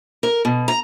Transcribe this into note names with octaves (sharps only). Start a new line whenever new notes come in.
A#4
B2
A#5